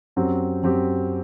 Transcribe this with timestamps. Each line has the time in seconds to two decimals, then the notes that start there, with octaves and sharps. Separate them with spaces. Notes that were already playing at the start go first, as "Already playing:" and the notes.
0.16 F#2 F#3 C4 G4
0.63 F#2 F#3 C4 G4